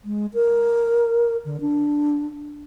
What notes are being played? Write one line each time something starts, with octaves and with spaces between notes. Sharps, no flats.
G#3
A#4
D3
D4